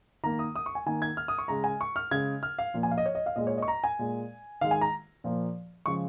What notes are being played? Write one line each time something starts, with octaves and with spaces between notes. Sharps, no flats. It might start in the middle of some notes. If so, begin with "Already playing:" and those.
D#3 A#3 A#5
D#6
D#6
C#6
G#5
D#3 A#3 G#5
G#6
F6
D#6
C#6
C#3 G#3 A#5
G#5
C#6
F6
C#3 G#3 G#6
F6
F5
A#2 F3 A#3
G#5
F5
D#5
C#5
D#5
F5
A#2 G#3 D#5
C#5
D#5 C#6
A#5
G#5
A#2 G#3
D#3 G#3 F5
G#5
A#5
A#2 F3 A#3
C#3 F3 G#3 C#6